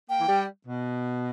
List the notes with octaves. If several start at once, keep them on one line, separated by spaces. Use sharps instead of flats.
A#3 G5
E3
G3
B2